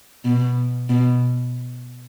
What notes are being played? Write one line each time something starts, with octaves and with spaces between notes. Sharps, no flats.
B2
B2